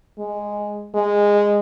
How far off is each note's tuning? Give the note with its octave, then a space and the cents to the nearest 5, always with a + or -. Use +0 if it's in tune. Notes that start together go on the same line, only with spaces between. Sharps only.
G#3 -5
G#3 -15